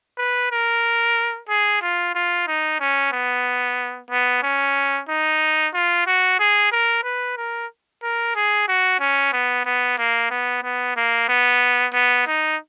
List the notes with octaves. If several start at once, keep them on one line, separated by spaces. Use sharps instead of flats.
B4
A#4
G#4
F4
F4
D#4
C#4
B3
B3
C#4
D#4
F4
F#4
G#4
A#4
B4
A#4
A#4
G#4
F#4
C#4
B3
B3
A#3
B3
B3
A#3
B3
B3
D#4